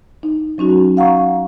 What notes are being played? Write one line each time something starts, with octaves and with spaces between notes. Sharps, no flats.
D#4
F#3 C#4 D#4 F#4
F5 F#5 A#5 C#6